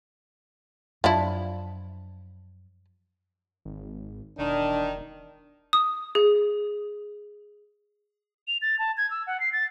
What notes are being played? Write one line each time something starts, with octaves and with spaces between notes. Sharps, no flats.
F#2 F3 D4 E4
G#1
E1 D#3 D4
D#6
G#4
F7
A6
A5
G#6
E6
F#5
C7
A6